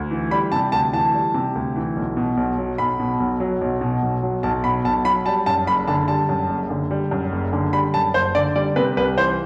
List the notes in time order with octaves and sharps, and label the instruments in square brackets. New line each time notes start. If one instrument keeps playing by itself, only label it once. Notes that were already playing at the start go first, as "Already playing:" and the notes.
Already playing: [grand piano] D2
E3
G3 B5
C3 A5
D2 A5
E3 A5
G3
C3
D2
E3
B1
B2
B1
F#3
B1 B5
B2
B1
F#3
B1
B2
B1
F#3
B1 A5
B2 B5
B1 A5
F#3 B5
G3 A5
F#2 A5
F#1 B5
D3 A5
G3 A5
F#2
F#1
D3
G3
F#2
F#1
D3
G3 B5
F#2 A5
F#1 C5
D3 D5
G3 D5
C3 B4
C2 B4
E3 C5